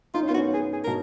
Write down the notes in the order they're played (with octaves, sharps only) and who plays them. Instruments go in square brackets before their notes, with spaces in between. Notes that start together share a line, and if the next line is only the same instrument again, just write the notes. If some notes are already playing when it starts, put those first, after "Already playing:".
[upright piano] D#4 [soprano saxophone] F4
[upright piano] C#4
[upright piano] B3 [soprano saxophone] F4
[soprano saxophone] F#4
[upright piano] C#4
[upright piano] B3 [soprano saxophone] G#4
[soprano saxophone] G#4
[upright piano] B2 [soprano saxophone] A#4